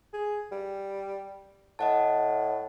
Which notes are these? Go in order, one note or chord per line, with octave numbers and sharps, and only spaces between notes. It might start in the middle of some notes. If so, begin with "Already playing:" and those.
G#4
G3
A2 D#5 F#5 A5